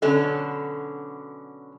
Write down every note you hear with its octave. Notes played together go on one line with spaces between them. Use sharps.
B2 D3 F#3 C#4 A4